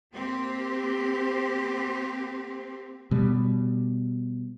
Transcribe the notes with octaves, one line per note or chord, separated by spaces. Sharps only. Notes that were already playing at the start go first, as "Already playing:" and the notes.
A#3 C4 G4
B2 G3